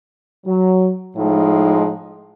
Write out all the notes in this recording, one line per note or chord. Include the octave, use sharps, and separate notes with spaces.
F#3
A2 F3 G#3 D#4